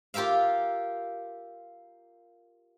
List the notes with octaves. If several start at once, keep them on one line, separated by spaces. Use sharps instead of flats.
F4 G4 A#4 E5 F5